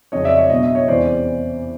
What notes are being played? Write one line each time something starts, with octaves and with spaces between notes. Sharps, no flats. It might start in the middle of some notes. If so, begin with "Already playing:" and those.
F2 C#3 F#3 C#5 D#5
D5 E5
C#5 D#5
B2 F#3 B3 D4 D#5
E5
C#5 D#5
E2 C3 E3 G#3 C#4 C5 D5